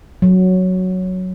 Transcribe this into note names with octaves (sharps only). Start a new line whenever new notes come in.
F#3